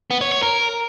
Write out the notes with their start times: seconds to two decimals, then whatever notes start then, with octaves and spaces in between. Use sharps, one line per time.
0.11 B3
0.21 C#5
0.32 C#5
0.42 A#4